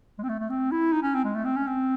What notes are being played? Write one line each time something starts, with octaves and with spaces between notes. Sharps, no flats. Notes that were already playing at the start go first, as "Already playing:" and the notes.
G#3
C4
A3
A3
C4
E4
D#4
C#4
C4
G#3
A3
C4
C#4
C4